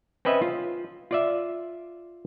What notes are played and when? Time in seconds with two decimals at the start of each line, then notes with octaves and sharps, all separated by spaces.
0.25 C4 C#4 B4 D#5 E5
0.42 F4
1.11 F4 D5 E5